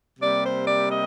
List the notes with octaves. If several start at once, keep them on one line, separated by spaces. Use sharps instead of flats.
C3 G3 A#3 D5
C5
D5
D#5